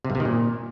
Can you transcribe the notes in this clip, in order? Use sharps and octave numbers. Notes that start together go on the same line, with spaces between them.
C3
G2
C3
D#3
A#2